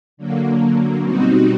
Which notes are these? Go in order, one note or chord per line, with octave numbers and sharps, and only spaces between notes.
D3 F#3 A#3
B2 G3 C4 D#4 F#4